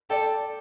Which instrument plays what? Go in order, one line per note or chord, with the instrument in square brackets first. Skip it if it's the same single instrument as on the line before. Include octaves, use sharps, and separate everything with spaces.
[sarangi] A4 [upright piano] D5 G5